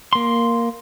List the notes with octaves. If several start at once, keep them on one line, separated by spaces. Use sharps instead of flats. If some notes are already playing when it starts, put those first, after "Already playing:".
A#3 C6